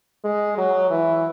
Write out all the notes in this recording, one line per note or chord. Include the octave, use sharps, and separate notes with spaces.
G#3
F#3
E3